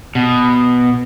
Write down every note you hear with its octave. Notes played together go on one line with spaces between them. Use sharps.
B2